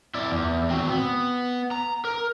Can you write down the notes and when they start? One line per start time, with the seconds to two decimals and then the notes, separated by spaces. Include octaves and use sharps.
0.14 E4 D5
0.31 E2
0.70 C4 F#4
0.90 B3
1.71 A#5
2.05 A#4